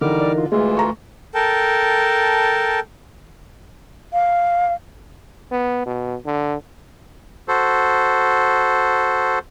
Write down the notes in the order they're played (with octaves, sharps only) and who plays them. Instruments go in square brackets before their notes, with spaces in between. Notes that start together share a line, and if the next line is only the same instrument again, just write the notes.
[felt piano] D3 [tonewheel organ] E3 D#4 A#4 [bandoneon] G3 D6 F6
[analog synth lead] D5
F4
[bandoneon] D2 E3 F4 [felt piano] G#3 [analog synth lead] A3 [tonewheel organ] G#4
[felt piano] A#5 C#6
[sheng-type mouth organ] A4 A#4 G5 A5
[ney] F5
[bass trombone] B3
B2
D3
[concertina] F#4 A4 C5